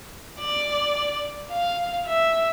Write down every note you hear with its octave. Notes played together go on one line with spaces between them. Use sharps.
D5
F5
E5